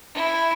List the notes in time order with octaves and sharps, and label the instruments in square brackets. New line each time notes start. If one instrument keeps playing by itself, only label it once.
[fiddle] E4